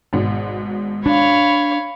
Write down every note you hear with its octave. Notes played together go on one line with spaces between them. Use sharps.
G#1 G#2 B2
D4 C#5 F5 B5